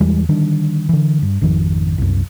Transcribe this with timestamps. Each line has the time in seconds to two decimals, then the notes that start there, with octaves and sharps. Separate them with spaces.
0.01 E2 E3 G3 G#3
0.29 D3 D#3 G3 D4
0.89 D3 E3
1.22 G2
1.41 G#1 F2 D#3 F3
1.98 C2 F#2